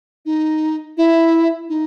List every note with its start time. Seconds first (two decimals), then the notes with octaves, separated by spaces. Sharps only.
0.26 D#4
0.97 E4
1.69 D#4